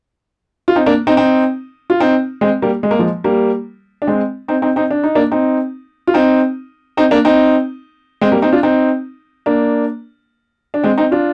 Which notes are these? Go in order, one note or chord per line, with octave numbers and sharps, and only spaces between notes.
F4
C4 D#4
A#3 D4
C4 D#4
C4 D#4
F4
C4 D#4
G#3 C4
G3 A#3
G#3
A#3
F3 G#3
G3 A#3
D4
G#3 C4
C4 D#4
C4 D#4
C4 D#4
D4
D#4
A#3 D4
C4 D#4
F4
C4 D#4
C4 D#4
A#3 D4
C4 D#4
G#3 C4
G3 A#3
C4 D#4
D4 F4
C4 D#4
A#3 D4
D4
G#3 C4
C4 D#4
D4 F4